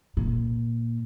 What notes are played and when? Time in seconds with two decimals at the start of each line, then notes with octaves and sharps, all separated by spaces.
0.17 A#2